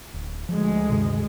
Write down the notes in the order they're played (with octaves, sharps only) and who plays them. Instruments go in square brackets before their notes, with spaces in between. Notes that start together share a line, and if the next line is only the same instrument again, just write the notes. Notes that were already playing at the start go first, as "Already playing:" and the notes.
[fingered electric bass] D1
[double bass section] D2 G#3 [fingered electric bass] F3
[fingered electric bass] G2 C3 D#3